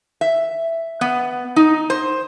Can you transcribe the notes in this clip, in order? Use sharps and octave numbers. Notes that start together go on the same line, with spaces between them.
E5
B3
D#4
C5